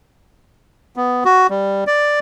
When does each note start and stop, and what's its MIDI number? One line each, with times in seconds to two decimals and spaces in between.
0.96 1.24 59
1.25 1.47 66
1.50 1.84 55
1.87 2.20 74